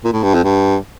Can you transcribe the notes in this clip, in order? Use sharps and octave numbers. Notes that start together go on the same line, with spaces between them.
A#2
A2
G2
F2
G2